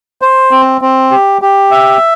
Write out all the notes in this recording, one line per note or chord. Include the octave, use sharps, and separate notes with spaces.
C5
C4
C4
G4
G4
E5